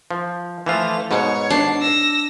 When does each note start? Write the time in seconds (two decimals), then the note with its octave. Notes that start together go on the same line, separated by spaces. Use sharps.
0.11 F3
0.66 E3 F3 A3 F4 F7
1.11 G#2 B2 C#5
1.50 D4 C7
1.82 E6 A#6